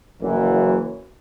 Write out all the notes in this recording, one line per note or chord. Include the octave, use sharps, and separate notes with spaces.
F#1 F#2 E3